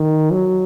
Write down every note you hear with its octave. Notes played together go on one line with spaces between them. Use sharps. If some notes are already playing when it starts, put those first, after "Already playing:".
Already playing: D#3
F#3